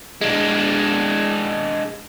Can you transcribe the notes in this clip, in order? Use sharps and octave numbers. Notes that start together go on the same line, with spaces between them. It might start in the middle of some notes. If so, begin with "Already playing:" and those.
G#3 D4